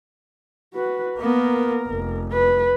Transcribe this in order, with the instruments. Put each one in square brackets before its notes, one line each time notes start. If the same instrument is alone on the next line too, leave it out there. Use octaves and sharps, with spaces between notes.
[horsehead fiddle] F#4 B4
[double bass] A#3 B3 [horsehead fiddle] A#4
[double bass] F1
[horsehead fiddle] B4